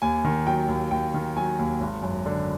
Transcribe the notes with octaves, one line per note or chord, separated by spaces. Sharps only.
D#2 G#5
D#3
F#3 G5
D#2
D#2 G5
D#3
F#3 G#5
D#2
G#1
F#2
D3